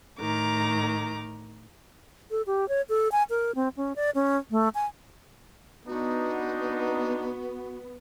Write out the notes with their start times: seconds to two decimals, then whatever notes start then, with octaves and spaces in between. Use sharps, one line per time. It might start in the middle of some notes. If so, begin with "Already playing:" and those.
0.18 A2 D#3 A#5 D6
2.31 A4
2.47 G4
2.69 C#5
2.89 A4
3.12 G#5
3.30 A#4
3.55 C4
3.77 C#4
3.96 D5
4.15 C#4
4.51 A3
4.75 G#5
5.88 B3 D4 D#4 F#4